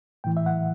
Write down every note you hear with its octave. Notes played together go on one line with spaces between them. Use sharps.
A2 E3 G5
E5
F#5